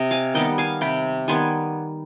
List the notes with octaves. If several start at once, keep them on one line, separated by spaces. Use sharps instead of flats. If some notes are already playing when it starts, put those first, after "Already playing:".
Already playing: C3 D#5
F5 G#5
D#3 G3 B3 D#5 G5
F5 G#5
C3 G5 B5
D#3 G3 B3 G#5 C6